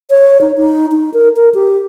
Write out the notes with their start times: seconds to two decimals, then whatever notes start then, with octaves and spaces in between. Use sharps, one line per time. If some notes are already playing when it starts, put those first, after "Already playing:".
0.10 C#5
0.41 D#4
0.57 D#4
0.91 D#4
1.14 A#4
1.36 A#4
1.54 G4